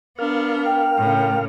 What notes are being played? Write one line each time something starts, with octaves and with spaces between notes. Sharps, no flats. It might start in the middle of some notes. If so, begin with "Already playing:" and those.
B3 D4 A#4 F5 F6
G5
A2 C#3